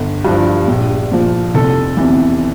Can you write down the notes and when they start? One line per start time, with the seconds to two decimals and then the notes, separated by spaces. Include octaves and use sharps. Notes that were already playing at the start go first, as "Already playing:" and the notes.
Already playing: G1
0.25 G2 F3
0.68 A#1
1.12 A#2 F3
1.55 F1 A4
1.97 E2 C3 E3